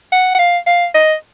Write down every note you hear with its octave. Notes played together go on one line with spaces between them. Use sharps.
F#5
F#5
F5
F5
D#5